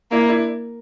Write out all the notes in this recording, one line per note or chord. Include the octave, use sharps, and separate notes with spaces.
A#3 D4 E4
D4 E4